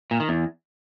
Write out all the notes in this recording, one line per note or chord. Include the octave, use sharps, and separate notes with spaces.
A#2
D#3
E2